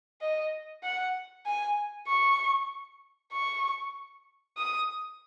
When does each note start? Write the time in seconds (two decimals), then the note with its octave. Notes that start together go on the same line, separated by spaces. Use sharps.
0.21 D#5
0.84 F#5
1.46 G#5
2.08 C#6
3.33 C#6
4.57 D#6